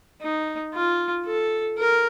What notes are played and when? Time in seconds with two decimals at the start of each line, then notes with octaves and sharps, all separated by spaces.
0.21 D#4
0.74 F4
1.26 A4
1.78 A#4